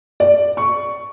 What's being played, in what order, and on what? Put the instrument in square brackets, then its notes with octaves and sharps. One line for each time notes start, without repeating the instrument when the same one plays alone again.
[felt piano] D5
C#6